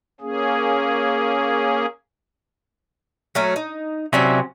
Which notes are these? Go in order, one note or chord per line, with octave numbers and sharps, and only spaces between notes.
A#3 C#4 G#4
F#3 A3 C#4
D#4
C3 F#3 C#4 E4 D5 E5